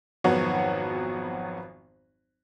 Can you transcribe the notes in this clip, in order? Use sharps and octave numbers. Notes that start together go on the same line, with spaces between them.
G#1 F2 F#3 B3 F#4 C#5